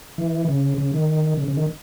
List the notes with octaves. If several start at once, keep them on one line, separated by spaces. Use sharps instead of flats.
E3
C#3
C#3
D#3
C#3
C#3
D#3